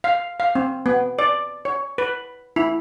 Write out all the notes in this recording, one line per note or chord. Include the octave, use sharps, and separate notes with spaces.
F5
F5
C4
B3
D5
C#5
B4
E4